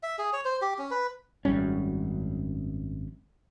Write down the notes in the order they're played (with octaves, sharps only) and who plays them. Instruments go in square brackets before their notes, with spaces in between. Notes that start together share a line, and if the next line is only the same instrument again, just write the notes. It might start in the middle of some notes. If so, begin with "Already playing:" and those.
[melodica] E5
G#4
C#5
C5
G4
C#4
B4
[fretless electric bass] G#1 F#2 G3 C#4